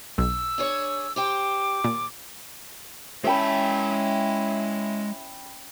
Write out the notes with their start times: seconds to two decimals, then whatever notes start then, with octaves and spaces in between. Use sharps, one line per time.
0.18 B1 E6
0.58 D4 G#4 C#5
1.16 G4 C5 G5 D6
1.84 D#2 A#2
3.24 G#3 C#4 E4 E5 G5 A5 B5